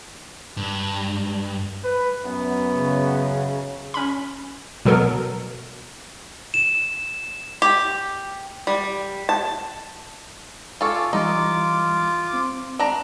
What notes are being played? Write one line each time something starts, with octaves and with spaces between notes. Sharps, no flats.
G2
B4
F#2 B3
C#3
C#4 B5
B2 F#3 B3 A4 A#4
E7
G4
G3
A5
F4 A4 G#5 C#6 D6
E3 G3 D#4 F4 D6
C4
D4 A#5